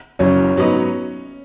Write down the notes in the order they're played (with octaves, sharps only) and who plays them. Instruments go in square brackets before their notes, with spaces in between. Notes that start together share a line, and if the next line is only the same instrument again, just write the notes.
[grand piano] F#1 F#2 F#3 [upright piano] C#4
[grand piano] G#2 F#3 B3 D#4